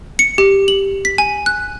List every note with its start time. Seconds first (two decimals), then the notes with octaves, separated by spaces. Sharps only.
0.19 C#7
0.38 G4
0.68 F#7
1.05 B6
1.18 G#5
1.46 F#6